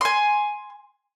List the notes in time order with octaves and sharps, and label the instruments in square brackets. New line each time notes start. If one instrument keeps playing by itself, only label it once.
[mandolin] G#5 C6